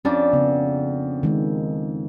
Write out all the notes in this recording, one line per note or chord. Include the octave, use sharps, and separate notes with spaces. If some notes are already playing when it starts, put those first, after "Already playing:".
F2 C#4 D4 D6
C#3 B3
D#3 G#3